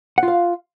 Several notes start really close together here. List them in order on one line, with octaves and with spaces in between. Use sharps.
F#5 F4 F5